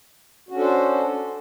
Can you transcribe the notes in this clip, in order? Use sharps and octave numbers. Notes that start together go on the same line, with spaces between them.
C#4 D4 F#4 A4 C5